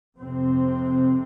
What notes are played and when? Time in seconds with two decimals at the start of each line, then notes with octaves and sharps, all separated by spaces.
0.18 F2 C3 C4